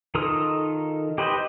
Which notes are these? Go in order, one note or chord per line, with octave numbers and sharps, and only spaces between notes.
D#3 F4 A4 A#4 D#6
G4 B4 C5 D#5